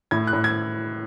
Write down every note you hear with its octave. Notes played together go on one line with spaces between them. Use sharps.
A2 G#6
F#6
A2
G#6